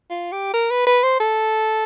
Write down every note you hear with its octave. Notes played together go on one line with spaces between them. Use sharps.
F4
G4
A#4
B4
B4
C5
A4